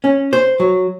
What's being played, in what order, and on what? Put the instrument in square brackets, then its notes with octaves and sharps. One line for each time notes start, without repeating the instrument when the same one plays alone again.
[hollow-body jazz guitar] C#4
C5
F#3